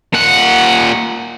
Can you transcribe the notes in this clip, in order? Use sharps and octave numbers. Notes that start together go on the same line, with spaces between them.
A#2 F#5